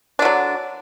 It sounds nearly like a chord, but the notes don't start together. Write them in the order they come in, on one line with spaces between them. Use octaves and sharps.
D4 D3 F#3